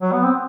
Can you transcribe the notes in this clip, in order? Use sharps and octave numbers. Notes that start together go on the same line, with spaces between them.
F#3
B3
C4